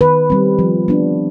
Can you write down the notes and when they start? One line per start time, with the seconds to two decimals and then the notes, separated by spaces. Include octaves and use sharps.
0.01 D#3 B4
0.30 G3 C4
0.59 F3
0.88 B3 D4